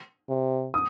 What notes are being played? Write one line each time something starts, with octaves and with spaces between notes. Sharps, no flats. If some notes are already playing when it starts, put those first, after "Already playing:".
C3
D#6